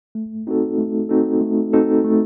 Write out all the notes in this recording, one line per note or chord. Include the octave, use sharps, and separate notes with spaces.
A3
C4 D#4 F#4 A4
A3
C4 D#4 F#4 A4
A3
C4 D#4 F#4 A4
A3